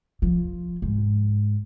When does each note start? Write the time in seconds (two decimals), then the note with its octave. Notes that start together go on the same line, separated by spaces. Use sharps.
0.22 F3
0.82 G#2